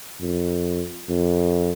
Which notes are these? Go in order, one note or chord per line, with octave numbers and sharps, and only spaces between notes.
F2
F2